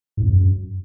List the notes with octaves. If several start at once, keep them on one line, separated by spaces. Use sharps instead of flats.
G#2
F2
F#2